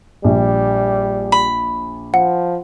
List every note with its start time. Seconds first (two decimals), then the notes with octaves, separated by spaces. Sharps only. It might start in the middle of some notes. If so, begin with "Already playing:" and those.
0.24 A#1 G3
1.32 B5
2.14 F3 F#5